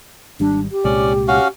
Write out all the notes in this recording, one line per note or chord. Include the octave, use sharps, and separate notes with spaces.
G#1 G3 D4
G4
C2 A#2 G#3 C#4 D5
C#4 F#4 F5